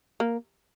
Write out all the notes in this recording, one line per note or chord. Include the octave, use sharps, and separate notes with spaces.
A#3